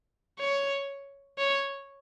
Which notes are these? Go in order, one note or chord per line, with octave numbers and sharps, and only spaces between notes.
C#5
C#5